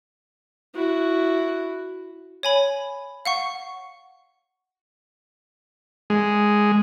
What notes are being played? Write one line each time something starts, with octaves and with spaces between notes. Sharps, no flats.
E4 F#4
C#5 G#5 B5
F5 F#5 C#6
G#3